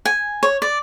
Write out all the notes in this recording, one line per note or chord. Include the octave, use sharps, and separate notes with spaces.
G#5
C#5
D5